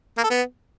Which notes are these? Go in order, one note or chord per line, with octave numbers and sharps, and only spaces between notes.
A#3
A4
B3